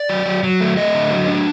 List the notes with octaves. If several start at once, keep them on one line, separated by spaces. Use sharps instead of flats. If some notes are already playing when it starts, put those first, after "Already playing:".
Already playing: D5
F#3
F#3
F#3
A3
A3 D#5
D3
F#3
D4